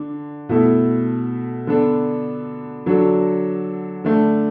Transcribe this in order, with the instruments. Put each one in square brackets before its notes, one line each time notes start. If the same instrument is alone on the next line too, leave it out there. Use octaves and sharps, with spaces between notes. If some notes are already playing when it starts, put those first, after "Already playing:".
Already playing: [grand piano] D3 D4
B2 A3 E4 A4
D3 B3 D4 A4
D3 F#3 D4 F#4 A4
D3 A3 D4